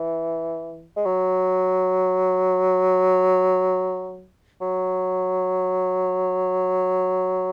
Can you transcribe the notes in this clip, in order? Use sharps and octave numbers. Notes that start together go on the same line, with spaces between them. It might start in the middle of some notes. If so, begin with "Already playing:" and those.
Already playing: E3
G#3
F#3
F#3